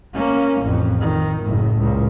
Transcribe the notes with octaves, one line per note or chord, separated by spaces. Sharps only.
A#3 C#4
A1 F2
D#3
F#1 A2
C#2 A#2